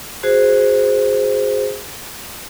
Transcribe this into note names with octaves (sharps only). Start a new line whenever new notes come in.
F#4 G#4 C5